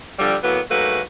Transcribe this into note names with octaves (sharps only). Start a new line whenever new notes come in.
D3 F3 G3
A2 F#3 A#3 B3
G#2 F#3 A3 A#3 B4